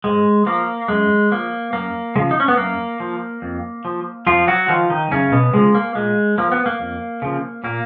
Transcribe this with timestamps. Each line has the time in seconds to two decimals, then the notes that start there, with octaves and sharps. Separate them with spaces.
0.04 G#2 G#3
0.46 F3 A#3
0.88 F#2 G#3
1.31 F3 A#3
1.73 F#2 A#3
2.15 C#3 G#3
2.19 F3
2.31 D#4
2.40 C#4
2.48 B3
2.57 F#2 A#3
3.00 F3
3.42 F2
3.85 F3
4.27 F2 F3 F4
4.47 F#3 F#4
4.68 D#3 F3 F4
4.90 D#3 D#4
5.11 F#2 C#3 C#4
5.32 B2 B3
5.53 C#3 F3 G#3
5.75 A#3
5.95 A#2 G#3
6.38 F3 A#3
6.52 B3
6.66 A#3
6.80 F2
7.22 C#3 F3
7.64 A#2 A#3